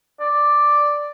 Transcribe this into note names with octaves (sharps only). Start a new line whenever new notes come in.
D5